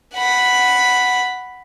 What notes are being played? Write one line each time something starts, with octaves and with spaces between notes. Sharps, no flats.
F#5 B5